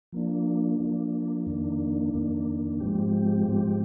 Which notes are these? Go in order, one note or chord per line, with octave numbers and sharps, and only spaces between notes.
F3 A#3 D4
F3 A#3 D4
F2 D#3 A#3 D4
F2 D#3 A#3 D4
G#2 F3 G#3 C4 G4
G#2 F3 G#3 C4 G4